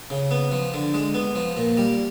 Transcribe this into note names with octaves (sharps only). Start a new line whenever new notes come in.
C#3
B3
F3
D3
G#3
B3
F3
A#2
G3